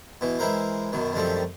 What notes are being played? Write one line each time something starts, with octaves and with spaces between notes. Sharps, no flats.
B2 E3
E3 G#3 E4 A#4 C5
F#2 B2 D#3
F#2 D#3 F3 G3 A3 C4